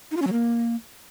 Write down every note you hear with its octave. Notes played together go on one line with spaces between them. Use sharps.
D#4
F4
C#4
F#3
A#3